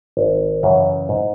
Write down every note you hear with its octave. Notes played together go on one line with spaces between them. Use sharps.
G#1
F#2 C#3 E3
G#2